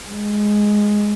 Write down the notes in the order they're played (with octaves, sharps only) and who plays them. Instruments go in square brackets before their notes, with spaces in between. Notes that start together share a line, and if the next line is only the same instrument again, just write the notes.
[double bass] G#3